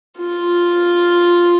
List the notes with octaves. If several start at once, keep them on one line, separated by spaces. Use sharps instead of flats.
F4